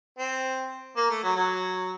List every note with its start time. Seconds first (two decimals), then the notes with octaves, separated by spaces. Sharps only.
0.19 C4
0.97 A#3
1.10 A3
1.23 F#3
1.36 F#3